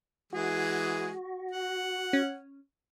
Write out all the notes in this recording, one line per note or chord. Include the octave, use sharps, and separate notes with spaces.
E3 G#3 F#4 G#4
F#5
C#4